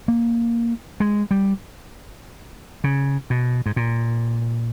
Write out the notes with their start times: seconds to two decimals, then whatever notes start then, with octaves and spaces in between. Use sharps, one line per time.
0.08 A#3
1.00 G#3
1.31 G3
2.84 C#3
3.30 B2
3.66 G#2
3.76 A#2